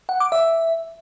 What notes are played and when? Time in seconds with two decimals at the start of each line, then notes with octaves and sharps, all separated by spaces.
0.09 F#5
0.20 D6
0.32 E5